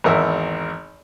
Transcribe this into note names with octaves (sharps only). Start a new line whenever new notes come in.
G#1 E2 A#4 E5